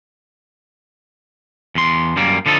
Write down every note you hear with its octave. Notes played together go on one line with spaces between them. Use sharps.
E2 C6
F#2 G3 A#3
D3 F3 D#4 A4